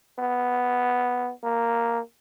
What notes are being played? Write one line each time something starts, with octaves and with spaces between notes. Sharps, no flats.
B3
A#3